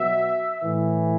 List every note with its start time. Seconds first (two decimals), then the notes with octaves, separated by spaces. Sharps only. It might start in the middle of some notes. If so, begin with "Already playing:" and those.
Already playing: B2 F#3 E5
0.64 A2 E3